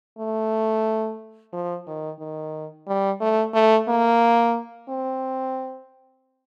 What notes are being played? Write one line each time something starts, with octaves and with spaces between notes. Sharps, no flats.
A3
F3
D#3
D#3
G3
A3
A3
A#3
C4